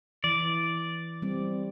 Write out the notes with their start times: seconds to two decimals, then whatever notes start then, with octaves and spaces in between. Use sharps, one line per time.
0.24 E3 D5
1.22 G3 C4